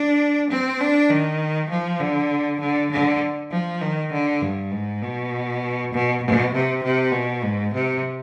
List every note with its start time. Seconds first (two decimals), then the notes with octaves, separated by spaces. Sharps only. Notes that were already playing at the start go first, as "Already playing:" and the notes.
Already playing: D4
0.50 C4
0.80 D4
1.10 D#3
1.70 F3
2.00 D3
2.60 D3
2.91 D3
3.51 F3
3.81 D#3
4.12 D3
4.42 G2
4.72 G#2
5.02 B2
5.93 B2
6.24 B2
6.54 C3
6.84 C3
7.13 B2
7.43 G#2
7.74 C3